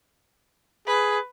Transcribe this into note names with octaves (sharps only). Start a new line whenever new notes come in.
G#4 B4